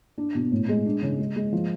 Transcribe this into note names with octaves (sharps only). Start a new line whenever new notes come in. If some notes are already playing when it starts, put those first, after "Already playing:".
D4
B2
A2
G#3
D4
C#3
G#3
G#3
F3